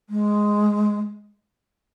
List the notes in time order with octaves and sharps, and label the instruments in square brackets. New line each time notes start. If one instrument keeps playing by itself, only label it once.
[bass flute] G#3